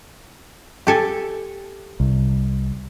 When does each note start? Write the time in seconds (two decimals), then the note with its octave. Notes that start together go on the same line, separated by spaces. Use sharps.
0.87 G4 A4 G#5
2.00 C2